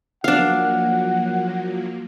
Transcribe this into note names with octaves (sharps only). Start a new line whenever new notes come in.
F3 F#3 A#3 D4 F5 F#5